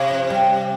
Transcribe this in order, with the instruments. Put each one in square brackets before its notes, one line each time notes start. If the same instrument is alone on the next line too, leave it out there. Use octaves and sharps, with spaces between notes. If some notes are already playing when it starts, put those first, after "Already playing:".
Already playing: [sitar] C3
[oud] F3
G3